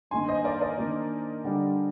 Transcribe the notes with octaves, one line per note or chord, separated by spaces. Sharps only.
G2 D#3 A#3 D#4 G#5 C6
C5 D#5
A#4 D5
A#4 D5
D#3 A#3 D4
D3 G3 D4